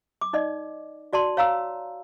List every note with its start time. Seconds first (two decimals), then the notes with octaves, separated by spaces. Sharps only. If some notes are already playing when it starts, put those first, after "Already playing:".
0.21 D6
0.33 D#4 D5 D#5
1.13 F#4 D5 A5 C6
1.37 C#5 F5 A#5 E6